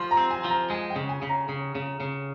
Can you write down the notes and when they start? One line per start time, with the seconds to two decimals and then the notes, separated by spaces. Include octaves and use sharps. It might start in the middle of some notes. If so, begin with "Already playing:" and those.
Already playing: F3 C6
0.11 A#5
0.17 C4
0.31 G#5
0.44 F3
0.50 A#5
0.70 G#3 G#5
0.90 G5
0.96 C#3
1.09 G#5
1.22 C#3
1.29 A#5
1.49 C#3
1.75 C#3
2.00 C#3